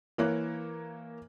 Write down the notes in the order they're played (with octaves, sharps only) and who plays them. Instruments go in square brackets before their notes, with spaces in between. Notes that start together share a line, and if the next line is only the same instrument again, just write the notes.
[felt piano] E3 A#3 C#5 F#6